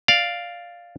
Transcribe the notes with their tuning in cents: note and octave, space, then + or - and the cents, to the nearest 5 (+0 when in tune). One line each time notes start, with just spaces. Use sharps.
D5 +0 F5 +0